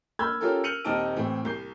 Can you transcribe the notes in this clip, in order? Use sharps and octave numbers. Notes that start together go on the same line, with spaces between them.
B5 E6 F6 G6 G#6
C#4 F4 G4 A4 A#4
F6 G6 C#7 D#7 F7 F#7
D#1 C4 D#4 A5 F6 D7
A2 E3 C4
C2 G6 C7